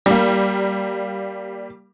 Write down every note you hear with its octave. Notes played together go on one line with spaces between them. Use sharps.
G3 A#3